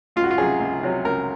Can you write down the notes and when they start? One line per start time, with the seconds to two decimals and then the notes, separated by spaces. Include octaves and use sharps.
0.16 C#2 F4
0.24 F#4
0.31 F4
0.38 C3 F#3 C#4 G#4
0.60 C#2
0.83 C3 F#3 C#4
1.05 C#2 A#4